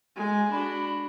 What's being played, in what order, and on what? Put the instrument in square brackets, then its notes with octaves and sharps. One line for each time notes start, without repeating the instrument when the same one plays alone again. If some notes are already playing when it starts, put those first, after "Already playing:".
[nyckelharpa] G#3 G#5
[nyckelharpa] D4 F#4 [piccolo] B5